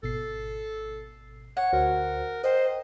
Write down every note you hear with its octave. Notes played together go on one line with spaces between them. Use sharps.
G#1 B2 A4 C7
C#5 F#5
D2 F#4 A#4 C5
A#4 C5 D#5 G5